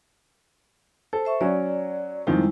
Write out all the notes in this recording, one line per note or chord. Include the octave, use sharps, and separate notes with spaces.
A4 C5
C5 E5 C#6
F#3 C#4 D5
F2 D#3 F3 G3 G#3 E4